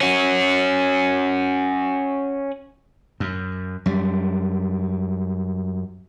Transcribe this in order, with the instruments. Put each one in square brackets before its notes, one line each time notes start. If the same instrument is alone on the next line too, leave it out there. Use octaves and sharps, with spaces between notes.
[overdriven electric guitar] C#4 F#4
[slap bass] F#2
F#2 G3